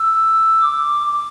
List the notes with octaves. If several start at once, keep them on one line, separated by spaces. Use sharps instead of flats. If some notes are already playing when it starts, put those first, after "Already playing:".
Already playing: E6
D6